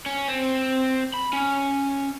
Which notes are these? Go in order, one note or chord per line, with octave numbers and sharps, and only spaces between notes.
C#4
C4
B5
C#4